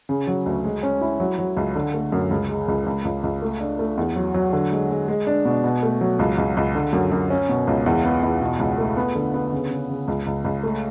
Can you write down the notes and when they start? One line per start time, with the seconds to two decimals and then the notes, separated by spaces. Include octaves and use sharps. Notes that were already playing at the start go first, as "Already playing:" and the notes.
0.09 C#3
0.27 F#3
0.46 D2
0.64 G#3
0.83 C#4
1.01 E4
1.20 F#3
1.39 F#3
1.57 C#2
1.75 D3
1.94 A3
2.12 F#2
2.31 C#2
2.50 G#3
2.68 C#2
2.86 C#2
3.05 C#2
3.23 C#2
3.42 A3
3.60 D4
3.79 A3
3.97 E2
4.16 F#3
4.34 F#3
4.53 D3
4.71 G#3
4.90 G#3
5.08 G#3
5.27 D4
5.45 B2
5.64 B2
5.83 A3
6.01 F#3
6.19 C#2
6.38 C#2
6.57 C#2
6.75 D3
6.93 F#2
7.12 F#2
7.30 C#4
7.49 B2
7.67 C#2
7.86 E2
8.05 B3
8.23 E2
8.41 B2
8.59 C#2
8.78 A3
8.97 B3
9.15 D3
9.34 B3
9.53 C#3
9.71 C#3
9.89 C#3
10.08 C#2
10.27 C#2
10.45 C#2
10.63 A3